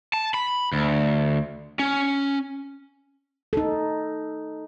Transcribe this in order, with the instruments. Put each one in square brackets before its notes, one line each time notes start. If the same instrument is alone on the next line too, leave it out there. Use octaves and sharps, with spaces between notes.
[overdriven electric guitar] A5
B5
D2
C#4
[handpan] D#4 A4